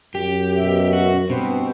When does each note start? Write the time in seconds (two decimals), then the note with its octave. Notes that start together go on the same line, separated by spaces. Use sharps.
0.15 F#2 G4
0.58 B2 E5
0.93 F#4
1.30 G2 B2 C4 C5